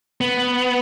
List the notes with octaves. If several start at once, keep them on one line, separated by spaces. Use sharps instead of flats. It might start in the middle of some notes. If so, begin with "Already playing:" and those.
B3